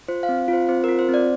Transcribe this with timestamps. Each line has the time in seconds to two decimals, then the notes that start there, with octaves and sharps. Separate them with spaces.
0.08 F4 C5
0.23 F5
0.29 C4
0.39 F5
0.48 F4
0.53 C5
0.68 C4 C5
0.84 F4 A#4
0.99 C5
1.09 C4 D5